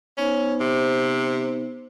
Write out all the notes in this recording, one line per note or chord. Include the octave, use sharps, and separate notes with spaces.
B3 C#4 D#4 C5
C3